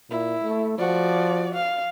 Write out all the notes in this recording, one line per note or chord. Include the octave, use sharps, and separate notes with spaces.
A#2 E4
A3
F3 F#4 D5
F5